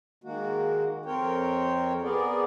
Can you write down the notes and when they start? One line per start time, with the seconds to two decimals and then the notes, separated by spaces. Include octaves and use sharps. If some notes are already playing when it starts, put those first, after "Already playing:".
0.24 D#3 G#3 A#3 F#4
1.06 F2 C4 A#4 C#5 G5
2.03 B3 G#4 A#4 D5